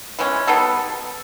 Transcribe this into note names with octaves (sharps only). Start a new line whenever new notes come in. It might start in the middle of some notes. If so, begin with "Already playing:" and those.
E3 G#3 C#4
B2 G3 B3 D#4 A4